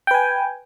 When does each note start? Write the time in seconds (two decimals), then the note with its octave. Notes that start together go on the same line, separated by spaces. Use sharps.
0.07 G5
0.11 B4
0.14 G#5